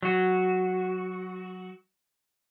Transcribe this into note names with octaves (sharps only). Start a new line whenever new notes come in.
F#3 F#4